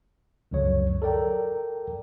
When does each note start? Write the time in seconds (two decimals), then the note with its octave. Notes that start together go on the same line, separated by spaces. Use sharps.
0.51 C#2 F#2 D3 F#3 C#5
1.02 A4 A#4 D5 G5 A#5